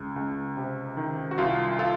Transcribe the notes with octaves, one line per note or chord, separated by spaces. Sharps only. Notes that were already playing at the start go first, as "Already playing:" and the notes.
Already playing: C#2
C#2
C3
D#3
F#4
C2 F4
F4 A4